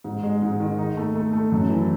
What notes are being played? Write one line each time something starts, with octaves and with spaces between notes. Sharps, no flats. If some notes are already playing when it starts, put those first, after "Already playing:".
G#2
G#3
G#2
D#3
D#4
A3
A3
A3
F#2
E3